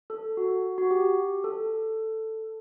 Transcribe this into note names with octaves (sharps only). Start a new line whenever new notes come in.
A4
F#4
F#4
G4
A4